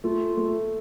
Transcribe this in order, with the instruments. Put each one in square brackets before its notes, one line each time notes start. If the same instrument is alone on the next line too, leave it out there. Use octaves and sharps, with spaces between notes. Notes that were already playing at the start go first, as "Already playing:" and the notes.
[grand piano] A3 [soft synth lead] F4
[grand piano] A3